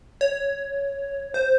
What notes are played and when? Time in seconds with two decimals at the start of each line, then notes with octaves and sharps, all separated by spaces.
0.21 C#5
1.34 C5